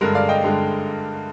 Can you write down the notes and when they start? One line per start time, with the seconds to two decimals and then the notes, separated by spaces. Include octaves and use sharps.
0.01 G2 D3 G#3 A#4
0.15 D5 F5
0.29 D#5 G5
0.43 G2 D3 G#3